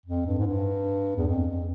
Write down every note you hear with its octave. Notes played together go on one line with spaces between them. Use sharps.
F2
G2
G#2
G2
E2
F2
F2